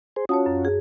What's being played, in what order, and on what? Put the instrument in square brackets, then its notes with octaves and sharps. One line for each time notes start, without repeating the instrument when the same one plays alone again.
[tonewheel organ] G#4 C5
[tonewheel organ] C#4 F4 F#4 [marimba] C#5 A5 D#6
[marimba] F#2
G#4